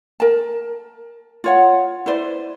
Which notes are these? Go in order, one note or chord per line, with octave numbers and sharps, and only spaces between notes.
A#4 A5
F4 C#5 F#5
E4 B4 C5 D5